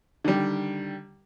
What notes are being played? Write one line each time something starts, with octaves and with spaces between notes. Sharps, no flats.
D3 D#3 G3